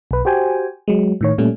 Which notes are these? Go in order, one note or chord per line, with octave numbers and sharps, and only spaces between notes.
B1 B4
F#4 G4 C5 G5 G#5
F#3 G#3
A2 D#3 C#5
A#2 G3 A3 C#4